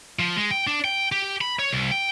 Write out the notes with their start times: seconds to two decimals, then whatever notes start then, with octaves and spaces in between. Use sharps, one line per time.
0.19 F3
0.37 G#3
0.51 G5
0.67 D4
0.84 G5
1.12 G4
1.41 B5
1.59 C#5
1.71 C2
1.91 G5